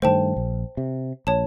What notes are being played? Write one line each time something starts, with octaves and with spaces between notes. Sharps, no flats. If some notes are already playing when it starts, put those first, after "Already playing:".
G2 D#3 A3 C5 G5 A5
A#1
C3
A#1 C#5 A5